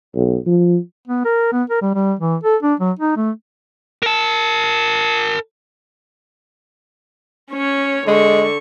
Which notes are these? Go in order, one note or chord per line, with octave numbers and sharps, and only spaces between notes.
B1
F3
B3
A#4
B3
A#4
G3
G3
E3
A4
D4
F#3
D#4
A3
A#4 A5
C#4 C#5
D3 G#3 C#6